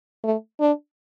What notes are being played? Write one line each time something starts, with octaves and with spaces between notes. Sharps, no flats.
A3
D4